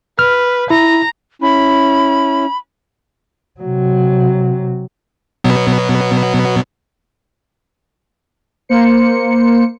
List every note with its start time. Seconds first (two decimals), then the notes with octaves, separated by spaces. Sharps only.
0.19 B4 F6
0.70 E4 A#5
1.42 C#4 E4 B5
3.60 C3 F#3
5.44 B2 F#3 B3
8.69 A#3 C5 C#7